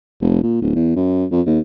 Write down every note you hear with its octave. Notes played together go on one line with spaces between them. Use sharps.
F1
A#2
D1
E2
F#2
F2
D#2